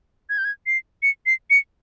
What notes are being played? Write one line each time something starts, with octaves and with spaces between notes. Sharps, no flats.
G#6
G6
G#6
C7
C#7
C7
C#7